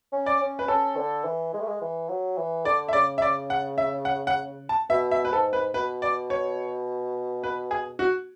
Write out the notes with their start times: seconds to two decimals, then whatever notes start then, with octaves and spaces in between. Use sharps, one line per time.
0.12 C#4
0.26 D5
0.41 C#4
0.59 B4
0.68 C#4 A4
0.97 D3
1.24 E3
1.53 G#3
1.60 A3
1.67 G#3
1.81 E3
2.09 F#3
2.37 E3
2.65 D3 D5
2.89 E5
2.93 C#3 D5
3.18 E5
3.22 D5
3.50 F#5
3.78 E5
4.05 F#5
4.27 F#5
4.69 A5
4.90 B2 E5
5.11 E5
5.25 B4
5.32 G#2 A4
5.53 B4
5.74 B2 B4
6.02 D5
6.30 C#5
7.44 B4
7.71 G#4
7.99 F#4